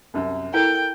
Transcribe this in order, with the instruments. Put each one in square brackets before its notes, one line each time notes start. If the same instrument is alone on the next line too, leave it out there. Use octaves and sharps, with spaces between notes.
[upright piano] C2 F#2
[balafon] E4 [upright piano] A4 A#4 [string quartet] G5